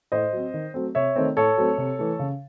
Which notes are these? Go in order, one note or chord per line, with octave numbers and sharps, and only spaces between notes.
A2 C5 D#5
F#3 C4
D#3
F#3 A3 C4
C3 C#5 E5
D#3 A3 C4
A2 A4 C#5
F#3 A3 C4
C3
E3 A3
C#3